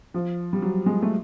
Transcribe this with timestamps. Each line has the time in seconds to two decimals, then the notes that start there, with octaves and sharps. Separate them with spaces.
0.14 F3
0.53 G3
0.62 F#3
0.86 G#3
1.02 A3